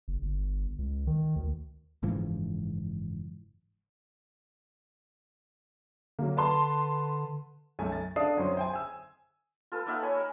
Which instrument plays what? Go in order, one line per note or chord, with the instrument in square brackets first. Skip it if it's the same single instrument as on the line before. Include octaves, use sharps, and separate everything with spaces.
[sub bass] F#1
G1
C#2
D#3
D2
[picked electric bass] F#1 G#2 E3 F3
[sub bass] D3 [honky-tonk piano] F#3 A#3
[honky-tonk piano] B4 A5 C6
[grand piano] B1 F#2 A3 G#5
A6
D4 A4 D5 F5 D#6 C7
F#2 F#3 C4 C5 C#5 C6
C5 G5 G#5
G#5 E6
[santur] F4 A4 B4
A#3 D#4 E5 F#5
C#5 G#5 B5
A#4